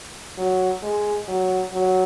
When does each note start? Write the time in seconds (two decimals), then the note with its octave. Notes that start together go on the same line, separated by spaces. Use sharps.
0.37 F#3
0.82 G#3
1.28 F#3
1.73 F#3